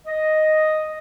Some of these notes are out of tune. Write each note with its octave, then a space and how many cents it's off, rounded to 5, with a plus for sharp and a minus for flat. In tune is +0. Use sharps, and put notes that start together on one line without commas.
D#5 +0